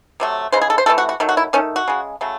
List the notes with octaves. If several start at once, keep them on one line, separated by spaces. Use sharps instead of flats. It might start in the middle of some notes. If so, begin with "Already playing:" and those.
C3 F#3 A3
C#3 E3 G#3 C5
G#4
A4
C5
C3 E3 A3 A4
F#4
F#4
D#3 F#3 A3
F#4
E4
D#3 A3 C#4
F#4
C#3 G#3
C#3 F#3 A3